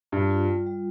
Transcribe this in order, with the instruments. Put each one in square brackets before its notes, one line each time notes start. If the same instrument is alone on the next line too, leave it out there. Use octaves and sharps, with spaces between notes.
[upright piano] G2 [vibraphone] F4
[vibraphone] F4
G3
G3